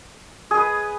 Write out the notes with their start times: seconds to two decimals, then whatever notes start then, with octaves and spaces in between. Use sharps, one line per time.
0.51 G#4
0.54 D#5
0.57 B4